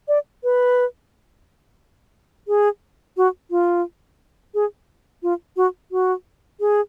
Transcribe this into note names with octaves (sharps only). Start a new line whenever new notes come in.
D5
B4
G#4
F#4
F4
G#4
F4
F#4
F#4
G#4